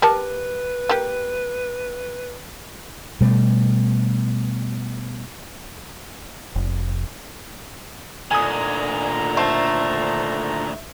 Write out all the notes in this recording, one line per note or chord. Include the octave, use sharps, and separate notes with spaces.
G4 A#4 B4 A5
A#3 G4
B2 G3 A3
F1
D2 A#2 D3 D#3 G#5 A#5 D#6
A3 C5 A5